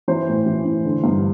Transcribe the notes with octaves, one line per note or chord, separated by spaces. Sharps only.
E3 C5
A2
E3
E3
D3
G2